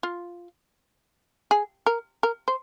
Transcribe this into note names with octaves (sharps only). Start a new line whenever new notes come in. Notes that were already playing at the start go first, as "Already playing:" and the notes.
F4
G#4
A#4
A#4
C5